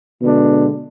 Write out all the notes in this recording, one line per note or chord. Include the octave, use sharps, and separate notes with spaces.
B2 D3 G#3 D4